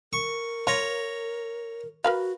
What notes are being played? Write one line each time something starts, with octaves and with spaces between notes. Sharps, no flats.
A#4 C#6
F4 C#5 A#5
F#4 A#4 B4 F5